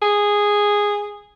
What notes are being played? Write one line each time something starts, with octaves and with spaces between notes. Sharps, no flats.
G#4